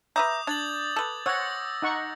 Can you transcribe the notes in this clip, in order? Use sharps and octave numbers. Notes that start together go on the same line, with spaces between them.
B4 E5 A#5 D6 D#6 G6
D4 G#6 A6 F#7
A4 B4
C5 C#5 F#5 E6 A#6
D#4 F#5 C#6